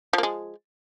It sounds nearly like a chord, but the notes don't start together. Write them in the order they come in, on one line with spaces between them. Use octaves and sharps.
F3 A#3 G#3